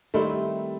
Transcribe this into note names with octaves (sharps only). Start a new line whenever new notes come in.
D#3 G3 A3 C4 E4